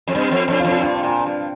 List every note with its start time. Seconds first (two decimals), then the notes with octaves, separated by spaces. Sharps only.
0.07 F2
0.15 G2 C4
0.31 F2
0.48 F2 D4
0.60 F2 F4
0.72 D4
0.81 G2 F4
0.95 D4
1.03 A#2 F4
1.19 D4
1.26 G2